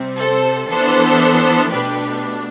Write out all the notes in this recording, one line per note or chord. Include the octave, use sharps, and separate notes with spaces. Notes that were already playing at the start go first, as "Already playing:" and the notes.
Already playing: C3 G3 C4
A4 C5
E3 B3 D4 A4 C5
B2 A3 D4 G4 B4